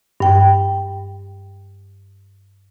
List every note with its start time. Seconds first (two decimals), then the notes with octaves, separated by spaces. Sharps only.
0.20 G2 G5